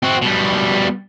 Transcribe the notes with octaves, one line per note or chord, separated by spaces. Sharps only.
C4 F#4
B2 G3